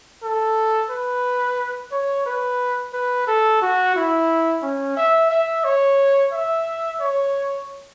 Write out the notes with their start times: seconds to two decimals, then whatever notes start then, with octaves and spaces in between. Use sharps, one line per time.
0.22 A4
0.90 B4
1.92 C#5
2.26 B4
2.93 B4
3.27 A4
3.62 F#4
3.96 E4
4.63 C#4
4.97 E5
5.31 E5
5.64 C#5
6.32 E5
7.01 C#5